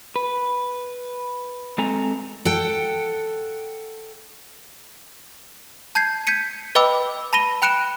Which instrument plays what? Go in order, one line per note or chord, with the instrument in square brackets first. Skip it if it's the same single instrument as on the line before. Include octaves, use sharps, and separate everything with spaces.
[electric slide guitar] B4
G#3 C4 A4 G#5 A#5
[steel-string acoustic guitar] A4 F#5 G5
[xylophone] A5 G6 G#6 C7
G6 G#6 B6 C#7 D#7
B4 D#5 G5 B5 D6 E6
A5 B5 A#6 D#7 G7
G5 B5 F#6 C#7 D7 E7